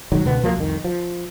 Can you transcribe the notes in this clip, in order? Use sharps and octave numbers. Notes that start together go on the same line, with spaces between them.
B1 G#2 D#3 F#3
C#2 B2 D3 B3
C#2 F3 F#3 A#3
C2 F2 D#3
F3